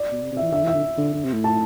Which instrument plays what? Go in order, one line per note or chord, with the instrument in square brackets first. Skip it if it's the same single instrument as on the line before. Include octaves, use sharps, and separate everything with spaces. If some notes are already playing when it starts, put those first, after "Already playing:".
Already playing: [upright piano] D5
[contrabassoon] B2
C3
C3
[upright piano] E5
[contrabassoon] E3
[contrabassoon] D3 [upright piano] E5
[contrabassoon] E3 [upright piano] E5
[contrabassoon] D3
D3
D3
C3
A2
[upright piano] A5